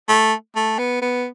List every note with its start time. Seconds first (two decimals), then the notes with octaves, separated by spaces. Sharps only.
0.09 A3
0.56 A3
0.79 B3
1.02 B3